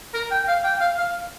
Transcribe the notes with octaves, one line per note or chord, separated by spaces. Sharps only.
A#4
G5
F5
G5
F5
F5